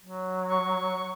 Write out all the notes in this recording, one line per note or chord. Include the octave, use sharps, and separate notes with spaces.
F#3
C#6